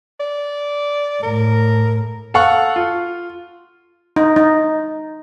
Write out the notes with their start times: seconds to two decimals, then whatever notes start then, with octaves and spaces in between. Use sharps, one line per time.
0.20 D5
1.23 A2 A#4
2.34 A4 F5 F#5 C#6
2.76 F4
4.16 D#4
4.36 D#4